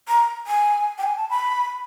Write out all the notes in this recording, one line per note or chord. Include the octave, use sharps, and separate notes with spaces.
A#5
G#5
G5
G#5
A5
B5